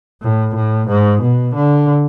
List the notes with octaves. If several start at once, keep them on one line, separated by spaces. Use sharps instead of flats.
A2
A2
G#2
B2
D3